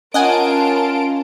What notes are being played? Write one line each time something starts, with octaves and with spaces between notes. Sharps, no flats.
C#4 F4 A#4 D#5 F#5 G#5 A5 D7